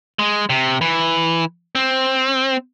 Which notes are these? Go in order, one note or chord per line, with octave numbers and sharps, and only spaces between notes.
G#3
C3
E3
C4